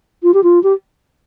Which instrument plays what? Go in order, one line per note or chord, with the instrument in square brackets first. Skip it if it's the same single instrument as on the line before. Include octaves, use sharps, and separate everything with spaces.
[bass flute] F4
G4
F4
G4